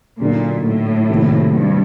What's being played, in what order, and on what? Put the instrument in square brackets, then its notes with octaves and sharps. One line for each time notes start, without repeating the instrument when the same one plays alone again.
[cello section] A#2 [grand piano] D3 F#3 A#3 D#4
[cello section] A2
[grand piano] C3 D#3 F#3 A#3
[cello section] G2